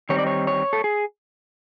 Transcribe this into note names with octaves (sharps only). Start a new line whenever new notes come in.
D#3 G3 C4 D#4 C#5
D5
C#5
C#5
A4
G#4